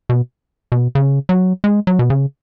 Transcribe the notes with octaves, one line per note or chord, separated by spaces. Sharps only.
B2
B2
C#3
F#3
G#3
F#3
B2
C#3